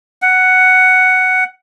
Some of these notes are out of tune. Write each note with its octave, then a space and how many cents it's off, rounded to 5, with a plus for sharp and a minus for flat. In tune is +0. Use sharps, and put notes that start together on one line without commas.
F#5 +5